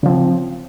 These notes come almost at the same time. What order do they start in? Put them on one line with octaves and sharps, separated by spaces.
C#3 F3 C4